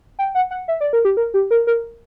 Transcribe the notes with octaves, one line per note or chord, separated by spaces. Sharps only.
G5
F#5
F#5
E5
D5
A#4
G4
A#4
G4
A#4
A#4